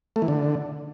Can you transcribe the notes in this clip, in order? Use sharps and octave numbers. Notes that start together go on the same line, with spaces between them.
A3
E3
D3